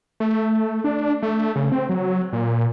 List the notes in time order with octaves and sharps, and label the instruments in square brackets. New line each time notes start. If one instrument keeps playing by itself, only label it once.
[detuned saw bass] A3
D4
A3
C#3
C4
F#3
A#2